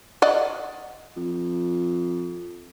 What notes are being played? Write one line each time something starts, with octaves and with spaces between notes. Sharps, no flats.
D5 D#5 F#5
F2